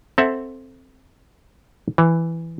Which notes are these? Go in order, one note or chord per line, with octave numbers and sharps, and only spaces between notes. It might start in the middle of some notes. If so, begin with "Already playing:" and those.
C4 A4 E5 F#5
E3